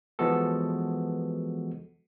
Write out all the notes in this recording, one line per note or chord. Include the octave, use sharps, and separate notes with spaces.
E3 F3 G#3 B3 F#4 A4